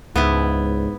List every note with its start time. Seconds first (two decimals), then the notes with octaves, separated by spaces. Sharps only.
0.16 C#2 G#2 B3 E4